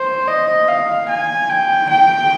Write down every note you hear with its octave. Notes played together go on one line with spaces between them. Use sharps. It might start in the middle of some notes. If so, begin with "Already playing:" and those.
Already playing: C5
D#5
F5
G#5
G5
G5